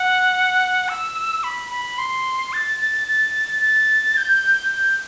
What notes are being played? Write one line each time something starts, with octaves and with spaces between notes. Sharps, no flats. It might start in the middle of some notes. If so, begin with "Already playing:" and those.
Already playing: F#5
E6
B5
B5
C6
A6
A6
A6
A6
G6
G6